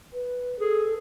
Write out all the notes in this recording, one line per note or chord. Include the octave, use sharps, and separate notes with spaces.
B4
G#4 A4